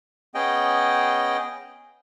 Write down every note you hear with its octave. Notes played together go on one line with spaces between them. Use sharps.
B3 C#4 G#4 D#5 G5